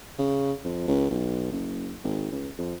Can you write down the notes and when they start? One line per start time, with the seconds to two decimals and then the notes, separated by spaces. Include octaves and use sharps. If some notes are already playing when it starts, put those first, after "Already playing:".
0.19 C#3
0.64 F2
0.88 C#2
1.11 B1
1.52 F#1
2.04 G#1
2.32 C#2
2.58 F2